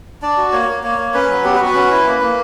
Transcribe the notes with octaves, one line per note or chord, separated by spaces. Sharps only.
D4 D5
F#4
A#3 C#5
A#3
A#3 C#5
A#3
C#4 B4
F#3
B3 G4
B4
F#4
B4
C#4
E4
A#3
A#3